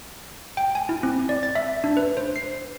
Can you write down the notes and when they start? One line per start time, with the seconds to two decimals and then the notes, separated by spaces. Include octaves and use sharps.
0.57 G5
0.75 G#5
0.89 E4
1.03 C4
1.29 D5
1.43 A6
1.55 E5
1.84 D4
1.97 B4
2.17 C5
2.36 C7